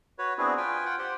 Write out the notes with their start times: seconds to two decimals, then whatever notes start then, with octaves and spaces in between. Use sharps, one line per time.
0.19 F#4 B4 C#5
0.38 B3 C4 D4 E4 F#4 G#4
0.57 F4 B4 G5 G#5
0.85 F4 F#5 G5
0.98 G4 C5 F#5